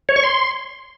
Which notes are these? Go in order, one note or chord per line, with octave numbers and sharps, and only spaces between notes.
C#5
C#6
C6